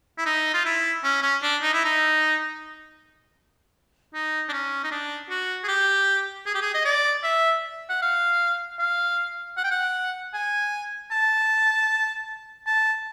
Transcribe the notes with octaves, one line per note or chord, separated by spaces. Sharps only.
E4
D#4
F4
E4
C#4
C#4
D4
D#4
E4
D#4
D#4
D4
C#4
D#4
D4
F#4
G#4
G4
G#4
G4
G#4
D#5
D5
E5
F#5
F5
F5
F#5
G5
F#5
G#5
A5
A5